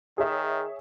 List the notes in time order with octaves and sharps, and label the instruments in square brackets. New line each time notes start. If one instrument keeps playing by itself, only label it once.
[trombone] D#3 [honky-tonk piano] G#4 C#5 E5